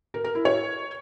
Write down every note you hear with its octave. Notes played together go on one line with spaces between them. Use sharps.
A#4
A#4
E4
C#5